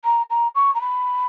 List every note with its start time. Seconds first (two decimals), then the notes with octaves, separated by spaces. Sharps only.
0.04 A#5
0.30 A#5
0.55 C#6
0.74 A#5
0.81 B5